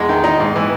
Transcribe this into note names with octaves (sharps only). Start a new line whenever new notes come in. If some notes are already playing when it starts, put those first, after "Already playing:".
Already playing: E2 G#3
D#3
D#4
G#2
E3